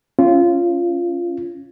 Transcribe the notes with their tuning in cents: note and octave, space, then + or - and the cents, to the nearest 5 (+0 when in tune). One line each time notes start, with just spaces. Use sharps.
C#4 +0 F4 -15